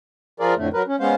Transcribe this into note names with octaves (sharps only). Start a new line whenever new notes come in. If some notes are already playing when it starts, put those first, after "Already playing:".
F3 F4 G#4 A#4 D5
F2 A2 D3 A3
F#3 A#4 B4
C#4
G#3 B3 C#4 C5 F5